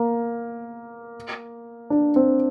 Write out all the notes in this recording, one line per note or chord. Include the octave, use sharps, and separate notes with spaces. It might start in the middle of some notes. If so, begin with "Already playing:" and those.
Already playing: A#3
D4
C4